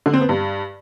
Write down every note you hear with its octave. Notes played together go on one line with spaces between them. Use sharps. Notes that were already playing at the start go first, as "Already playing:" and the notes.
D3
C4
B3
G2